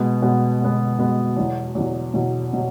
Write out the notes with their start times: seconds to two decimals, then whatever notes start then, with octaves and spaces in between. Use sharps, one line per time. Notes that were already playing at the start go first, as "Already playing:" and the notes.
Already playing: B2 G#3 B3
0.22 B2 G#3 B3
0.60 B2 G#3 B3
0.98 B2 G#3 B3
1.37 E2 B2 F#3
1.75 E2 B2 F#3
2.14 E2 B2 F#3
2.53 B2 F#3